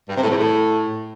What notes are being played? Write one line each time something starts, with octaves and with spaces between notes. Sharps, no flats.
G2
C3
A2
E2
A2